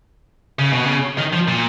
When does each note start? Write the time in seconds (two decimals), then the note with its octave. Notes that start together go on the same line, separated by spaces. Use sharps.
0.59 C#3
0.73 B2
0.86 C#3
1.18 D#3
1.33 F3
1.48 A#2